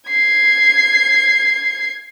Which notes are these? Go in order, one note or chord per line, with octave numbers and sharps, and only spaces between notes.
G#6 C7